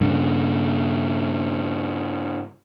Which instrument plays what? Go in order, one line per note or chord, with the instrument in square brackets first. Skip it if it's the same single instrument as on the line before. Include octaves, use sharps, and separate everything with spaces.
[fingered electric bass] G2 C#3